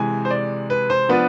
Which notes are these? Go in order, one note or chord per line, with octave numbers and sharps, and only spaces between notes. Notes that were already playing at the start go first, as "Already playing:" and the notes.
Already playing: C3 E3 G#3 G#5
C5
D5
B4
C5
F3 B3 D4 B4